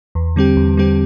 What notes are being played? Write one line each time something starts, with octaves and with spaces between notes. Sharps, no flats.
E2
D3 G3 C4 G4
E2
D3 G3 C4 G4